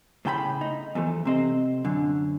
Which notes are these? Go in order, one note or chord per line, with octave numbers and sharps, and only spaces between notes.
A2 C#3 G5 A#5 B5
D#4
E2 F3 A3
C3 C4 D#5
F#2 D3